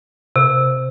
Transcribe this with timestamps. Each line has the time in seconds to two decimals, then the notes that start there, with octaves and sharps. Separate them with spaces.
0.36 C3